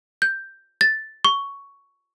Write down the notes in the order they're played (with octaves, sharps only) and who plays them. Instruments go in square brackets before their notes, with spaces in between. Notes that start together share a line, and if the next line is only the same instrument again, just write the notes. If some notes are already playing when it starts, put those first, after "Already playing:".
[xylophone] G6
A6
C#6